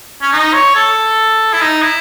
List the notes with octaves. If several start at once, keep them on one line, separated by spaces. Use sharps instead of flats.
C#4
D#4
C#5
A4
E4
D#4
E4